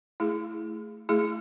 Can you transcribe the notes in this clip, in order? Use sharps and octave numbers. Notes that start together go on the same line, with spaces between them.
A3 E4 G#4
A3 E4 G#4